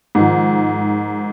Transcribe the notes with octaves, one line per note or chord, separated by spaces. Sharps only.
G#2 D#3 F3